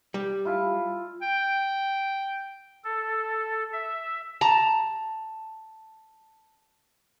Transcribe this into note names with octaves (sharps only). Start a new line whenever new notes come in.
G3
E4 F4 A5
G5
A4
E5
A5 A#5